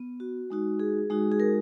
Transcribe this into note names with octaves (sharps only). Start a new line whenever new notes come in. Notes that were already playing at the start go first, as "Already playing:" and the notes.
Already playing: B3
F#4
G#3 D#4 F#4
G#4
G#3 D#4 F#4
G#4
A#4